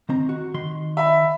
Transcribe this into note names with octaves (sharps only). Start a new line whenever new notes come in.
D#3 C4 A#5
F#4
D#3 C6
E5 B5